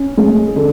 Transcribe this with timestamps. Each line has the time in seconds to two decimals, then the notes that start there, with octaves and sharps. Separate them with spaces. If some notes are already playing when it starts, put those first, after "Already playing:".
Already playing: C#4
0.17 G#3
0.56 D3